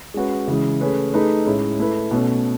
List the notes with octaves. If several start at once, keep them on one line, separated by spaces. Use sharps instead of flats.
G#3 C#4 F#4 B4
C#3 E3 G#3
A3 C#4 G#4 B4
A3 D#4 G#4 B4
A2 G#3 C#4 E4
A3 E4 B4
B2 A3 C#4